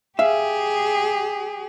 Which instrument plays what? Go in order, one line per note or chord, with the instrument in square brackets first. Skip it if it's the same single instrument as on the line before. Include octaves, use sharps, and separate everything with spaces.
[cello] G4 G#4 [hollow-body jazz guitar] E5 F5